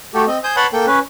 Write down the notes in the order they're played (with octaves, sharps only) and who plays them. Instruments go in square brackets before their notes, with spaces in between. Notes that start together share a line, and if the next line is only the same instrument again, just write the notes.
[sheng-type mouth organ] A3 F#4 G4 A4
C4 D#5
C5 G#5 D#6 G6
B4 C#5 F#5 A5 B5 C6
A#3 A4 G5
C#4 B4